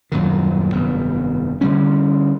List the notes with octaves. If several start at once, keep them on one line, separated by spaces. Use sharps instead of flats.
D#1 F#2 A#2 D#3
F1 G2 D#3 B3
D3 F#3 G3 C#4